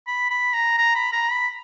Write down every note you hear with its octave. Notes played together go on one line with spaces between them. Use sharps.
B5
B5
A#5
A#5
B5
A#5
B5